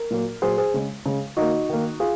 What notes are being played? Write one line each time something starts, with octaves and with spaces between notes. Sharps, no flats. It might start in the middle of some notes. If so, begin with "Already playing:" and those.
Already playing: A#4
A#2 F#3 A#3
A#2 F#3 A#3 G#4 C5
G#4 C5
C#3 G#3
C#3 G#3
D#3 A#3 D#4 F#4
D#3 A#3
F4 G#4